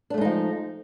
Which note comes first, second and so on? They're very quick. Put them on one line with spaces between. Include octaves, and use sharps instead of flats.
D4 A3 G#3 D#4 F3